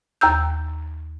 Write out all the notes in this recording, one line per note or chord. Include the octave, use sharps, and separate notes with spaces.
D#2 A#5 E6 G6